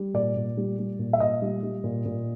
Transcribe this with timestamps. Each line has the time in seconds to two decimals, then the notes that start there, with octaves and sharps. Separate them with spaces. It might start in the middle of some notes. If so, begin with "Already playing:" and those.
Already playing: G3
0.14 A#2 D5
0.36 A#2
0.57 G3
0.79 G3
0.99 A#2
1.13 E5
1.20 A#2 D#5
1.42 G3
1.63 G3
1.84 A#2
2.06 A#2